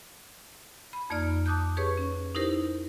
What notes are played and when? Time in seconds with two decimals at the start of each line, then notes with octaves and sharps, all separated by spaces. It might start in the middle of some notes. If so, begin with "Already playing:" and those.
0.93 B5
1.10 F2 A#3 D#4 D5 F6
1.46 A5 D6 D#6 F#6 G6
1.77 G4 G#4 B4 C#5 C#6
1.98 C#4
2.35 D#4 E4 G4 A#4 C5